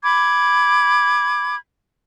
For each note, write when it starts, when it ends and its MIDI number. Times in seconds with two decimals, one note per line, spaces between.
0.03 1.56 83
0.03 1.56 86
0.03 1.56 92